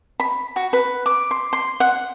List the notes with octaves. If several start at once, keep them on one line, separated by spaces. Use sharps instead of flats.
B5
F#4
B4
D6
C6
C6
F#5